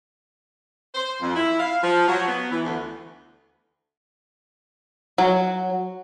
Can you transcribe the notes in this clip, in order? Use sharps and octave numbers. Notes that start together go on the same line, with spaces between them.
C5
F2
E4
F5
F3
F#3
B3
E3
D2
F#3